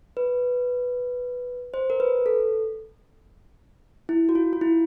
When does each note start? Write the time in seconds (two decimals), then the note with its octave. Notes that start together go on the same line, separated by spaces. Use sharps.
0.17 B4
1.74 C5
1.90 A#4
2.00 B4
2.26 A4
4.09 E4
4.29 F#4
4.35 F4
4.53 F4
4.61 E4